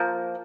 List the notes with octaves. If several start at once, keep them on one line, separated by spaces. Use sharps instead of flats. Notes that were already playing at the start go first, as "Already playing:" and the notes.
Already playing: F3 A#3